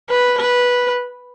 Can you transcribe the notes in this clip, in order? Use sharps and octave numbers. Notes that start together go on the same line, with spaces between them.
B4
B4